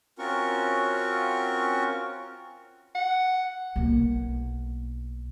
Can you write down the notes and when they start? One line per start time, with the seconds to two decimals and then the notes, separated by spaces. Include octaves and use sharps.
0.19 C4 C#4 F4 F#4 A#4 C#6
2.95 F#5
3.76 B1 A#3